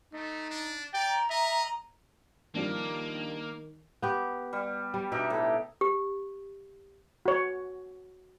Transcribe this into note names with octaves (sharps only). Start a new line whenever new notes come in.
A3 D#4
D4
D5 G5 A#5
D#5 E5
D#3 F3 G3 A#3 D4
B3 G4
G3
G3
B2 D4 D#4 G4 E5
A2
G4
F#4 C#5